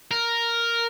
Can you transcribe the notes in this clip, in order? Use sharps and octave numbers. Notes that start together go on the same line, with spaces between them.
A#4